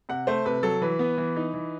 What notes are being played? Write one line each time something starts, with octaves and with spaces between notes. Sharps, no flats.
C3 F#5
A3 C5
C3 B4
F#3 A4
E3 B4
B3
E3
D#4
E3